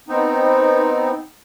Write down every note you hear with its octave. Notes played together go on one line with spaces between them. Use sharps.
B3 C4 D#4